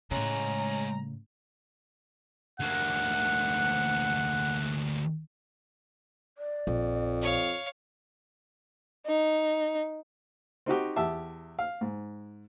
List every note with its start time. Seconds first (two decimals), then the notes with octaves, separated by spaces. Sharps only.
0.11 A2 C#3 G#3 C#4 F#5 A#5
2.60 D2 A#3 F#5 F#6
6.38 D5
6.67 A#1 F2
7.22 C#5 F5
9.07 D#4
10.66 C4 D#4 F#4 G4
10.96 E2 G4 E5 A5
11.59 F5
11.81 G#2